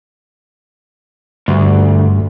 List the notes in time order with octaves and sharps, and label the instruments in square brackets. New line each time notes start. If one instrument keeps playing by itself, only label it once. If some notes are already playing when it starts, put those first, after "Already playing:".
[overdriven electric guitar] D2 [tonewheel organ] G2